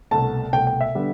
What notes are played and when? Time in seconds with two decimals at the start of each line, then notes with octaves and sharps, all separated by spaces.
0.11 C2 B2 A3 A5
0.53 C2 B2 A3 G5
0.67 G5
0.81 E5
0.95 D3 G3 B3